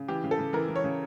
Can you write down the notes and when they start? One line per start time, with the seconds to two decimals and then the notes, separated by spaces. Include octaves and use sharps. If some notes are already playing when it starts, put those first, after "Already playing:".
Already playing: C#3
0.08 E3 G4
0.24 C#3
0.31 A4
0.39 C#3
0.53 E3 A#4
0.68 E3
0.76 C#5
0.84 C#3